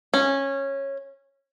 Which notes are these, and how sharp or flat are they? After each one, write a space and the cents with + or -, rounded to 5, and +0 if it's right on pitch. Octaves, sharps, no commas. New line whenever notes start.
C#4 -15